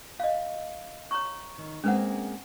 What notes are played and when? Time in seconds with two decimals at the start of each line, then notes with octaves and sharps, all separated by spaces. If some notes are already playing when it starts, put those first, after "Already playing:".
0.20 D#5 F5
1.11 C#5 A#5 C#6
1.58 D#3
1.84 G#3 A#3 C4 C#4 B4 F#5